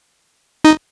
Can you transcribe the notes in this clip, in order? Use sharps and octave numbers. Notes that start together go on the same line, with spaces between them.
D#4